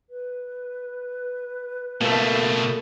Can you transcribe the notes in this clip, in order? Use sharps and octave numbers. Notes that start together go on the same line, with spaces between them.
B4
B2 A3 A#3 A4